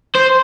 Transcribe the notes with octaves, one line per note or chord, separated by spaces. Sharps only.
C5